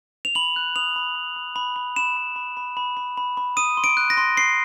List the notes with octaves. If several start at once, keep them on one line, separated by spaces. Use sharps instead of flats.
F7
B5 F#7
F#6
D#6 F7
B5
B5
B5
B5
B5
B5 E7
B5
B5
B5
B5
B5
B5
B5
D#6 D#7
C6
D7
F#6
A#6
C6
C6 C7